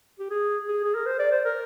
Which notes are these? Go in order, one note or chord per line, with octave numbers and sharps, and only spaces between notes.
G4
G#4
G#4
G#4
A#4
C5
D5
C5
A#4